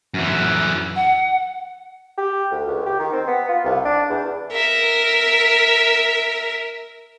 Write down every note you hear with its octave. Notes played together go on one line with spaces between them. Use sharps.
F#2 E3
F#5
G4
D2
C#2
G4
D#3
C4
B3
F4
C2
D4
E2
A#4 E5